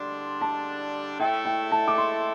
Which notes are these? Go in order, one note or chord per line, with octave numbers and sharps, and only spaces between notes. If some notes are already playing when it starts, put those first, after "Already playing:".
Already playing: D3 G3 D4 C6
A5
A2 A3 E4 A4 G5
G5
A5
D6
C6